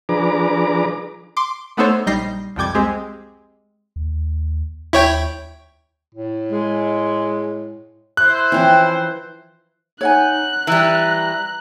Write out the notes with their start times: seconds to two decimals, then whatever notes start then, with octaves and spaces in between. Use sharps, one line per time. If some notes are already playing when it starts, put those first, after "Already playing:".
0.09 F3 D4 G#4 B4 A#5 D6
1.37 C6 D6
1.77 A3 B3 D#4 A4 C5 C#5
2.06 A#1 G3 D#4 G6 A#6 C7
2.56 C2 F2 G3 G5 D6 G#6
2.75 G#3 C4 G4 G#4
3.96 D#2
4.93 D#2 E4 C#5 G5
6.15 A2
6.51 G#3
8.17 E4 C5 F#6
8.52 E3 F3 C4 C#4 G5
10.01 D#4 C#5 F#5 G#5 F#6
10.67 E3 G3 A#5